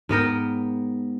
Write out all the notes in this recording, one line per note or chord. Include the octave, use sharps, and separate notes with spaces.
G#2 B3 A#4 G5